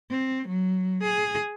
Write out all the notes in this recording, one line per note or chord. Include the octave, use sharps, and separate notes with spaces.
C4
F#3
G#4